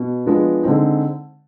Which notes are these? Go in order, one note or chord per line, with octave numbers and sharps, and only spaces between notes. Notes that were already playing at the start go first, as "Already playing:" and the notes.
Already playing: B2
F3 G#3 B3 D4
D3 G#3 C4 D#4